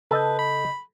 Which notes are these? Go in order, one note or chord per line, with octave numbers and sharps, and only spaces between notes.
C#3 A4 B4 D#5 A5 G6
B5